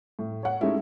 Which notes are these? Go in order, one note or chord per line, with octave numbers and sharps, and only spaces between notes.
A2
C#5 F#5
G#3 A3 C#4 D#4 E4 G4